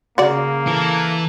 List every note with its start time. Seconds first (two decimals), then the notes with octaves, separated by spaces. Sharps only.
0.18 C#3 A#3 F#4 D5
0.67 E3 A4